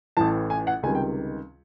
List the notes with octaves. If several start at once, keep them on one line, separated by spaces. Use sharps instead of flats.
A1 A2 E3 A5
G#5
F#5
C#2 C3 D#3 G3 G#5
G5